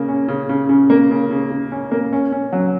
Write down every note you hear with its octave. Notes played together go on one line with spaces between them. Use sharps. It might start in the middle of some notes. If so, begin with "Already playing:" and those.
Already playing: C#3 A#3
C#4
C#3
C#3
C#3
A#3
C#3
C#3
C#3
C#4
A#3
C#4
C#4
F#3